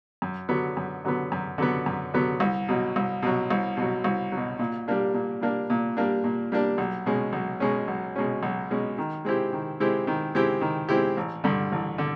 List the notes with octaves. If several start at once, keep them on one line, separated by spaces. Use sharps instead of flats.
F#2
D3 F#3 B3
F#2
D3 F#3 B3
F#2
D3 F#3 B3
F#2
D3 F#3 B3
C2
B2 F#3
C2
B2 F#3
C2
B2 F#3
C2
B2 F#3
A#2
G3 A#3 D4
A#2
G3 A#3 D4
A#2
G3 A#3 D4
A#2
G3 A#3 D4
B1
B2 G#3 C#4
B1
B2 G#3 C#4
B1
B2 G#3 C#4
B1
B2 G#3 C#4
D#3
G#3 C4 E4 G4
D#3
G#3 C4 E4 G4
D#3
G#3 C4 E4 G4
D#3
G#3 C4 E4 G4
A1
G2 D3
A1
D3